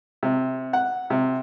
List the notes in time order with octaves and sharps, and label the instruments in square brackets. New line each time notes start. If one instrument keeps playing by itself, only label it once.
[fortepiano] C3
F#5
C3